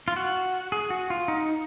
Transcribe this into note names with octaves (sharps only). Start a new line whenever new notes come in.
F4
F#4
G#4
F#4
F4
D#4